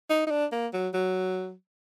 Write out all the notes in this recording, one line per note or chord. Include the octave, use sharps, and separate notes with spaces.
D#4
D#4
D4
A#3
F#3
F#3